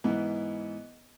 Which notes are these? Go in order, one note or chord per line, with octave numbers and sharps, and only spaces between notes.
G#2 E3 B3